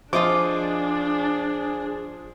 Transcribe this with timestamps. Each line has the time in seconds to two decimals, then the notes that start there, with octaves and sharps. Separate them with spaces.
0.13 F3 D4 F4 G#4 D#5 D6